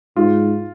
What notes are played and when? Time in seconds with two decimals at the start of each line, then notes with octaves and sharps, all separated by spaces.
0.16 G#2 F4